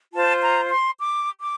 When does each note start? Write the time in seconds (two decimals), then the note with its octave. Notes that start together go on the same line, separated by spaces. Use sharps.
0.12 F4 C5 A5
0.41 A#5
0.69 C6
0.97 D6
1.39 D6